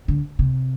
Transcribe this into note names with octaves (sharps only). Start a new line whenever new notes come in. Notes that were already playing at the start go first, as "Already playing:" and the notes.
D3
C3